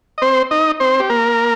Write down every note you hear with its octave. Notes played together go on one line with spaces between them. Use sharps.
D#5
C4 C5
D#4 D#5
C4 C5
G4
A#3 A#4